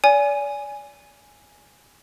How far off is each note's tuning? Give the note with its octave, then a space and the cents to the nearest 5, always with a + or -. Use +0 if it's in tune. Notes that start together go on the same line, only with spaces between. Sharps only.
D5 -35 G#5 +0